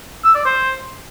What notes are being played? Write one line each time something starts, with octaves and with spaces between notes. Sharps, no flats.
E6
D5
C5